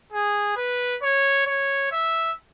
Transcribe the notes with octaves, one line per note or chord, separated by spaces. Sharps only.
G#4
B4
C#5
C#5
E5